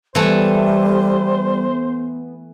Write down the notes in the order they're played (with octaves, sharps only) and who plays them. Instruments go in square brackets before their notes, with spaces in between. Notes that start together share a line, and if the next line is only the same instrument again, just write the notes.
[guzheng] E3 A3 [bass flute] G3 [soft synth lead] B3 [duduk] C5